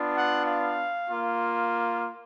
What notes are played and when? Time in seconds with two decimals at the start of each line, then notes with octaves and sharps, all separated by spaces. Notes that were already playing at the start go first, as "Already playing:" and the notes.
Already playing: B3 D4 F4
0.15 F#5
0.46 F5
1.09 A#3 F4